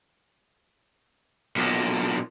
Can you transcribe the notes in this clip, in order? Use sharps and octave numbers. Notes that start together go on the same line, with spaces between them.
B1 A#2